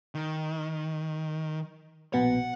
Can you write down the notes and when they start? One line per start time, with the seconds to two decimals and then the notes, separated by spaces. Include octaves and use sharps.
0.15 D#3
2.14 A#1 B2 B3 F#5